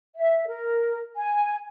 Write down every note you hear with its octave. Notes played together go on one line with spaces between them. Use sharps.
E5
A#4
G#5